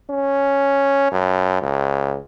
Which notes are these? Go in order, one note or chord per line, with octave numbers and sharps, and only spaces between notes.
C#4
F#2
C#2